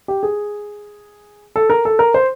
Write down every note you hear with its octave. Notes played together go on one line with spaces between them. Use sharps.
G4
G#4
A4
A#4
A4
A#4
C5